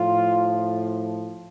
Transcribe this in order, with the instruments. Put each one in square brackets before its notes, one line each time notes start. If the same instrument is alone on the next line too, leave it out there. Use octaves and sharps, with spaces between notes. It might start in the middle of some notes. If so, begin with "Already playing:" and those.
Already playing: [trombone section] A2 F3 F4